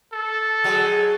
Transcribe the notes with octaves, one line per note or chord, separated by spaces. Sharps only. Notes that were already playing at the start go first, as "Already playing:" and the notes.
A4
F#3 G#3